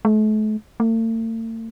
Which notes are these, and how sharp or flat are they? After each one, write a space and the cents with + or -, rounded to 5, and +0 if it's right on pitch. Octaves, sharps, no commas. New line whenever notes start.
A3 -40
A3 +45